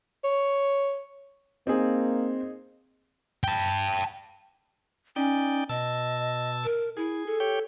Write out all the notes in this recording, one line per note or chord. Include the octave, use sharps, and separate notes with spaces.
C#5
A#3 C4 D#4 G#4
G5 A5
C#4 D#4 D5 G5
B2 D#5 A5 E6
A#4
E4 G#4
A4
G4 C#5 G5